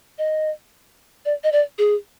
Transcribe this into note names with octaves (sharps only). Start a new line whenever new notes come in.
D#5
D5
D#5
D5
G#4